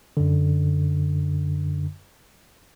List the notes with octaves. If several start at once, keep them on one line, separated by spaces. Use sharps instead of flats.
F#2 D3